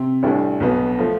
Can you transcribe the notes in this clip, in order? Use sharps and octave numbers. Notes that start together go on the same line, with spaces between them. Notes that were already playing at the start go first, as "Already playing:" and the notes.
Already playing: C3
A1 A2 G3 D4
B1 B2 B3
F3 A3